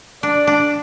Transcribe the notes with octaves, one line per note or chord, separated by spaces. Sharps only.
D4 D5
D4